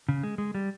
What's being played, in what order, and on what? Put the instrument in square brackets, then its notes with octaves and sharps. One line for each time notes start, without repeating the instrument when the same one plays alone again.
[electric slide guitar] C#3
G#3
G#3
G3